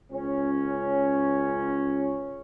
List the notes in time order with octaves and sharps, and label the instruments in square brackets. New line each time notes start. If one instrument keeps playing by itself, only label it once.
[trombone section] C#2 C#4